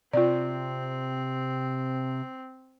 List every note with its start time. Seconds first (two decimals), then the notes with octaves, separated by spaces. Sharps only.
0.13 C3 C4 F4 D5